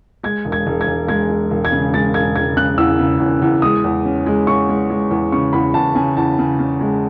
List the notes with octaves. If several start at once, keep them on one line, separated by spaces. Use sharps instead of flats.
G#3 G#6
E1
G#6
E1
G#6
E1
G#3 G#6
G#3
E1
G#6
C#3
G#3 A6
E1 G#6
E1 G#6
C#3 F#6
E2 E6
C#3
E2
E2
G#3 D#6
E2
C#4
G#3
C#4 C#6
G#3
G#3
E2
C#3 C#6
E2 B5
E2 A5
C#3 G#5
E2 A5
C#3
C#3
G#3